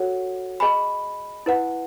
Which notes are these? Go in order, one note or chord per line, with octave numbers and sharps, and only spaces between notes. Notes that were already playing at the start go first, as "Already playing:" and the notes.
Already playing: F#4 A4 C#5 F#5
G#4 D#5 G#5 B5
E4 B4 F#5